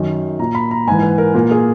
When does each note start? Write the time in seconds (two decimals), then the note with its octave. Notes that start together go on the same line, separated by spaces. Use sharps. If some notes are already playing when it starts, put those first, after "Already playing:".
Already playing: F#2 D#3
0.39 A#2 A#5
0.55 B5
0.71 A#5
0.87 G#2 E3 G#5
1.03 B4
1.18 A#4
1.34 A#2 A#4
1.51 G#4